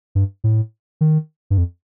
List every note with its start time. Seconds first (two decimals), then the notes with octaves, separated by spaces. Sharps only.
0.15 G2
0.44 A2
1.01 D#3
1.50 G2
1.58 F2